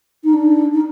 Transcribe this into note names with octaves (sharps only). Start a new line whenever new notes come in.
D#4
D4
D#4